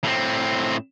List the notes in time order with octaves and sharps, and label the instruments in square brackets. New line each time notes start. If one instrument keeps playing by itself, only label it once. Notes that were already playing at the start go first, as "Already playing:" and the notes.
[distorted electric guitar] A2 C4